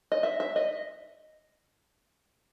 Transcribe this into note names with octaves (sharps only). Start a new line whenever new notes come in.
D#5
E5
E5
D#5